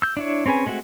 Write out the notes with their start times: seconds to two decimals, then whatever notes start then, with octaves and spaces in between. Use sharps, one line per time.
0.02 E6 G6
0.17 D4 E4 C#5
0.46 C4 C#4 G#4 B4 G#5
0.66 G#3 A3 C4 F#4 G#4